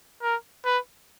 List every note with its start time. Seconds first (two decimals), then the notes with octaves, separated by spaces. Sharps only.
0.22 A#4
0.65 B4